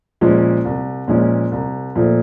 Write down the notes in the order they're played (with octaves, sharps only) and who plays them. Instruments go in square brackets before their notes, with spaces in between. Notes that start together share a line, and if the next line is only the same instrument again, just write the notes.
[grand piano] A#2 F3 G#3 C#4
C2
A#2 F3 G#3 C#4
C2
A#2 F3 A3